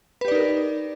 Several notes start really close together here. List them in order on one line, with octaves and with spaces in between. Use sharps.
B4 G4 D5 D#4 A#4